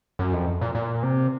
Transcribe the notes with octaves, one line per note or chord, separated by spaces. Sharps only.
F#2
F2
A#2
A#2
C3